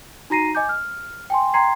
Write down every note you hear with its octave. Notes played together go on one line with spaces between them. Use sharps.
D#4 F#4 A#5 A#6 C7 D#7
D#5 G#5 D6 G6
F6
G5 G#5 C6
G5 A#5 C6 G#6 C7